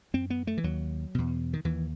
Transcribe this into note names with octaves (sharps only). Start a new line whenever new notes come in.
F#2 C4
B3
A3
E3
D#2 F#3
E2 B2
D#3
D#2 E3